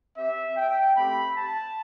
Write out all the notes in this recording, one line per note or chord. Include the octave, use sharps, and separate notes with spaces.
C4 G4 E5
G5
A3 C4 G4 B5
A5